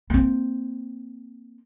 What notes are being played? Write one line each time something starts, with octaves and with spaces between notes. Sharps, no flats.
A#3 C4